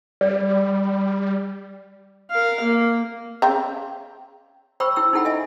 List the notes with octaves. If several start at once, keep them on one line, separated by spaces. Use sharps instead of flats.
G3 D5
A#4 F5
A#3
C#3 G5 A#5
C5 G5 B5 C#6 E6
E4 G5 E6
D#4 E4 A4 F#5 G5 B5
D#5 E5 G#5